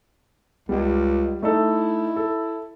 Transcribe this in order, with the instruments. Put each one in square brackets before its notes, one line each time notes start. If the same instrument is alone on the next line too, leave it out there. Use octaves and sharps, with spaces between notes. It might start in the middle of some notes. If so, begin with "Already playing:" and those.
[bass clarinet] C#2 [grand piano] G3
[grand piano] A3 D#4 A4 [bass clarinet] E4
[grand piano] A4